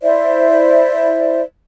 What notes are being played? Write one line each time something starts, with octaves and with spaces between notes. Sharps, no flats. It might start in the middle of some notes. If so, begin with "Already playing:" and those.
E4 C5 D5 E5